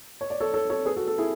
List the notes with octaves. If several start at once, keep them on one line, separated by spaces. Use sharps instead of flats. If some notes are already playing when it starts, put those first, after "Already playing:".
C#5
D5
A4 C#5
A4 C#5
A4 C#5
G#4 B4
F#4 A4
F#4 A4
E4 G#4